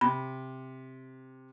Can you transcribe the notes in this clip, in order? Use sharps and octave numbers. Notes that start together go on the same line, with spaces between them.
C3 B5